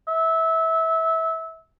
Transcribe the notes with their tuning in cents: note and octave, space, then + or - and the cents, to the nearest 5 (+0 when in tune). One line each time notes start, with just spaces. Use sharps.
E5 -20